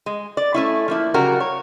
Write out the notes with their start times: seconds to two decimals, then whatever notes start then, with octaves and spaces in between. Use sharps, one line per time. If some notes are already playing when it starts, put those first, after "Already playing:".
0.06 G#3
0.37 D5
0.54 A3 C#4 E4
0.88 F3 A#3 E4
1.14 C#3 F#3 G3 F#4 A#4
1.40 C#5